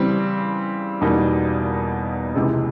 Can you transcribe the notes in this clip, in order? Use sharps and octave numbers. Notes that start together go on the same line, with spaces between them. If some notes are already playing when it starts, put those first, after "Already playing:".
Already playing: C#3 E3 G3 C4
E2 B2 G3 A#3 D#4
C#2 C3 E3 G#3